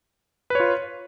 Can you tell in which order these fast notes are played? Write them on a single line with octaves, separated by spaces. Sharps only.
B4 C#5 F4